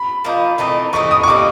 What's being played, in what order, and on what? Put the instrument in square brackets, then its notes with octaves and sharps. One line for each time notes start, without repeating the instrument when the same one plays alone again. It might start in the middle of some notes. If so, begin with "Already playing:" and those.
Already playing: [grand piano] B5
[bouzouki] F3 A#3 D#4
E3 A3 C4 D#4
[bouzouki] E3 A3 C4 D#4 [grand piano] C#6
[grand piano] D#6
C#6
[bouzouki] E3 G3 A#3 D#4 [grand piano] D6